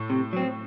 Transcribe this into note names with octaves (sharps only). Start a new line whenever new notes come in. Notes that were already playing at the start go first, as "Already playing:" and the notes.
Already playing: A2
C3
F#3 C4